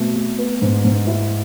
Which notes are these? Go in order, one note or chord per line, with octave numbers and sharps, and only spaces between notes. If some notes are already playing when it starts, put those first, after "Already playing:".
Already playing: B2 A3 C4
A3
B3
G#2
G#2
E4